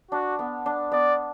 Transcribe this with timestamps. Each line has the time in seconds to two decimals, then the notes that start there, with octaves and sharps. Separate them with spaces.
0.11 D4 F#4
0.39 B3
0.66 D4
0.92 B3 D5